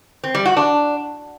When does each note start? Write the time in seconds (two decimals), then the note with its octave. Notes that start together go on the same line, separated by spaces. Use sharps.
0.24 C4
0.35 G3
0.46 F#4
0.57 D4